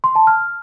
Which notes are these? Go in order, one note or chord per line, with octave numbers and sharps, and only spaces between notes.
C6
A5
F6